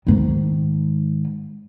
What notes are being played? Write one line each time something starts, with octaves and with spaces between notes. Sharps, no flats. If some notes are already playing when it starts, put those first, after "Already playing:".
G#2 D#3